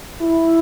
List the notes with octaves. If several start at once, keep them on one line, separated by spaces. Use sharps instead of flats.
E4